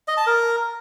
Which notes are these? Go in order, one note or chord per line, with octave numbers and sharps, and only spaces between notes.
D#5
A5
A#4